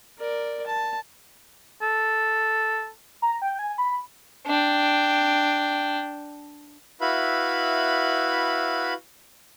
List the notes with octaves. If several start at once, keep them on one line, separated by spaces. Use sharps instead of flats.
A#4 D5
A5
A4
A#5
G5
G#5
B5
D4 G5
E4 F#4 B4 E5 F5 B5